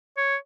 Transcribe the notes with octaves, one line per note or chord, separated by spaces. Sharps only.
C#5